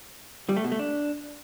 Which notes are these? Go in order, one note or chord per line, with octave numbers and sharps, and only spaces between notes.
G3
A3
B2
A3
D4